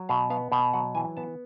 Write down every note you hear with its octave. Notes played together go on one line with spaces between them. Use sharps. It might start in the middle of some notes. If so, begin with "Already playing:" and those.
Already playing: F#3
B2 F5
B3 F5
B2 G5
F#3 F#5
E3 G#5
B3 A5